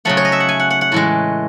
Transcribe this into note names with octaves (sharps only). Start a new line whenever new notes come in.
C#3 F#3 A3 F#5
C#5
D#5
E5
F#5
G#5
F#5
F#5
F#5
A2 E3 G#3